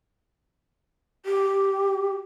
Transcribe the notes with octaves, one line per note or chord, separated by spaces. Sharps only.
G4